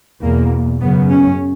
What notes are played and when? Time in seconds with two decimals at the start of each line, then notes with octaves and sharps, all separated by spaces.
0.22 E2 B2 A#3
0.81 F#2 C#3 B3
1.10 C#4